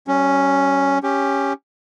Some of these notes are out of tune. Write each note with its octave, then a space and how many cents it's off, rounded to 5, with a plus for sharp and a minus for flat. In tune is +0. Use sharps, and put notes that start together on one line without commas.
G3 -40 C#4 +0
C#4 +0 G4 +10